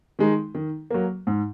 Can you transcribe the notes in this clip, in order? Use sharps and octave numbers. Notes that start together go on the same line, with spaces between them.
D#3 G#3 D#4
D#3
F#3 A#3
G#2